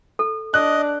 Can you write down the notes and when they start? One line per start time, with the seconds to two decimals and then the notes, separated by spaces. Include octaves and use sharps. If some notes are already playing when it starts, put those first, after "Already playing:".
0.19 A4
0.54 D4 D#5 F#6